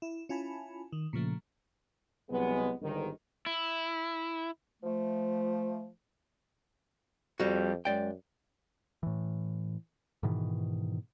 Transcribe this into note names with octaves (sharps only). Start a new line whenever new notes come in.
E4
C#4 E4 F4 G#5 A5 B5
D#3
A#2 C#3 F3 A3
C2 F#3 G#3 B3
G1 G#2 D#3
E4
F3 A3
F2 G3 F#4
F#2 G#3 D5 G5
A2 E3
G#2 B2 D#3 E3